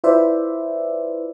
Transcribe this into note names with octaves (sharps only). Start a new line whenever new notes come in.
E4 F4 B4 C5 D5 E5